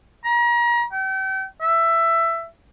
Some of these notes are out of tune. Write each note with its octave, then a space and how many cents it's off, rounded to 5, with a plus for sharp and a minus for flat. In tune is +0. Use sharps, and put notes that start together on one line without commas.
A#5 +35
G5 -40
E5 +15